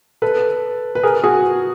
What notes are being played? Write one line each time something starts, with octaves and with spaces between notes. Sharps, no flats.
A4 B4
B4
G#4 A#4
F#4 G#4